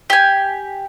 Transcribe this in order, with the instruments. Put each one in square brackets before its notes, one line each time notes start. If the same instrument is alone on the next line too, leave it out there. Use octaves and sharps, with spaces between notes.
[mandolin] G4 G#5